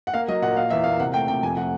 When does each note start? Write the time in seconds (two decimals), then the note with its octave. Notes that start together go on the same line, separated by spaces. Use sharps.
0.07 F#5
0.14 A#3 F5
0.28 F#3 D#5
0.42 A#2 F#5
0.57 A#3 F5
0.70 E2 E5
0.84 A#3 F5
0.99 C3 F#5
1.14 A3 G5
1.28 C3 G5
1.43 F2 G#5
1.56 A3 F#5